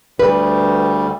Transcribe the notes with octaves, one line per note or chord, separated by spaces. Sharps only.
D2 G3 B4